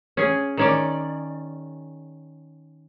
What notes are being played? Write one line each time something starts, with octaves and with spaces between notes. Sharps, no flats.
C#4 G#4
D#3 C#4 D5